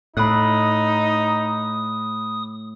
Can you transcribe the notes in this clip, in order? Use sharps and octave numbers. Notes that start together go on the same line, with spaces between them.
A2 D#4 B5 D#6 F#6